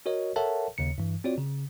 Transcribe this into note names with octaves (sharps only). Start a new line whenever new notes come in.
F#4 A#4 C#5 D#5
A4 A#4 C#5 E5 F#5 A5
D#2 C#3 C#7
G2 E3
C4 F4 F#4 C#5 D5
C#3